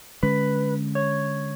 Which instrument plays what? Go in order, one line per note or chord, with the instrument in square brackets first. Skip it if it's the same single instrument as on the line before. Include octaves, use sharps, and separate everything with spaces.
[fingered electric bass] D3 G#3 C#4 [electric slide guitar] B4
[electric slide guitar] C#5